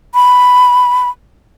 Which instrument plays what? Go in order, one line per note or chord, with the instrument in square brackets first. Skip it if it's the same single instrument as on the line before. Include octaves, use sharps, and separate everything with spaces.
[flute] B5